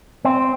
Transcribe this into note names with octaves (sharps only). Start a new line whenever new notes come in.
C4